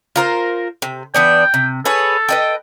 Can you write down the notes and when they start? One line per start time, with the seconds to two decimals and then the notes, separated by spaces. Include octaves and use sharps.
0.16 F4 A#4 C5
0.82 C3
1.14 E3 B3 D4 G5
1.54 C3
1.85 G#4 A4 B4 C#5
2.29 B4 D#5 G5